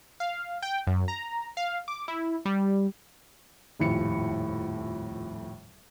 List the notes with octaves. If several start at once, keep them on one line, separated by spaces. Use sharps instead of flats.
F5
G5
F#2
A#5
F5
D6
E4
G3
D#1 F2 A2 C#7